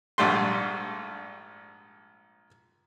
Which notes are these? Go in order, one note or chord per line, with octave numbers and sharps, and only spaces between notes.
A#1 G#2 G3 A3 C6